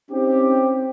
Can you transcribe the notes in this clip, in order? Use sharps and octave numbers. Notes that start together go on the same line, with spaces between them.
C4 C#4 D#4 G4